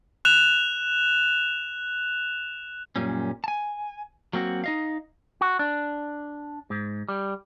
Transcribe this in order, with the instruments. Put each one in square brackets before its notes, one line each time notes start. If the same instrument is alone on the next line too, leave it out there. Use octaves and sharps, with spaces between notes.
[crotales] F#6 E7 F7
[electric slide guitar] F#2 A#2 G3 C#4
G#5 A5
F#3 A#3 C4 F#4
D#4 D#5 F5
[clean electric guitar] F#4
D4
G#2
G3